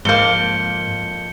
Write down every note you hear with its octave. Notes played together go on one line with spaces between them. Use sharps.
F2 G#2 A#3 G6 C#7 G7